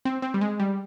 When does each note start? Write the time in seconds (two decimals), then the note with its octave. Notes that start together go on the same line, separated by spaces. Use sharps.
0.05 C4
0.22 C4
0.34 G3
0.41 G#3
0.60 G3